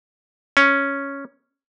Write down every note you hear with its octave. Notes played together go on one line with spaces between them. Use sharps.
C#4